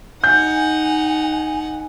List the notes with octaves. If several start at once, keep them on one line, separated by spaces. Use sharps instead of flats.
D#4 F#5 G#5 G6